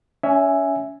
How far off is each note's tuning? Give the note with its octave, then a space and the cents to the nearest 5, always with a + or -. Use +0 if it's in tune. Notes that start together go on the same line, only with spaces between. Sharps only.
C#4 +30 E5 +0 G#5 +0